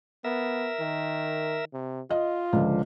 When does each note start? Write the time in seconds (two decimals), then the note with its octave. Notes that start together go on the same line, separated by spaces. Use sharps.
0.25 B3 A#4 E5
0.80 D#3
1.73 C3
2.10 F4 D#5
2.53 C#2 D3 F3